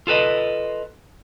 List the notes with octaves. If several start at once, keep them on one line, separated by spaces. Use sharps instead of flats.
F4 A4 B4 D#5